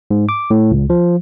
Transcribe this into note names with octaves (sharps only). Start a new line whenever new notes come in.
G#2
D6
A2
C#2
F3